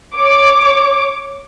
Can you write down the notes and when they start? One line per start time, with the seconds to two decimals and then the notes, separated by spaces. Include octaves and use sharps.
0.15 C#5 D6